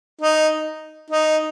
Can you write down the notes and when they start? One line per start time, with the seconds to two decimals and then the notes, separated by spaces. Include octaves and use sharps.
0.21 D#4
1.10 D#4